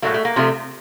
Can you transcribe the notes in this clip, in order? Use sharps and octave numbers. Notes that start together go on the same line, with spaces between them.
A2 F#3 A3 A#3
A3
A#3
C3 F3 A3